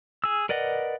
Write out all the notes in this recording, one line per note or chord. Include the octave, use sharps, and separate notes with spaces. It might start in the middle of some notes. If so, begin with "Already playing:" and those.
G#4 E6
A#4 B4 D5 D#5 F#5